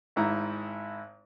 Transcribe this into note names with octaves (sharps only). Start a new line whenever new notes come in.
G#1 G#2 E4 A#5